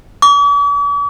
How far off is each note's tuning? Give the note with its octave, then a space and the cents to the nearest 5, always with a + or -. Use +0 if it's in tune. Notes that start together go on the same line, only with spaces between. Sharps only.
D6 -45